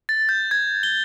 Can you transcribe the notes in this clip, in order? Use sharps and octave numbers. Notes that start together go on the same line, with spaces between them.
A6
G6
G#6
G7